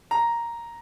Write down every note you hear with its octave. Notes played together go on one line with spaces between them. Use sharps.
A#5